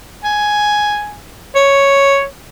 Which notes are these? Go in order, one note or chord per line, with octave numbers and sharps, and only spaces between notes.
G#5
C#5